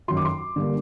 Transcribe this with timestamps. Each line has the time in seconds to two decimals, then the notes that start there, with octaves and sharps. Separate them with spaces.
0.08 F#2 D#3 F#3 C6
0.17 D6
0.25 C6
0.56 D3 G3 A#3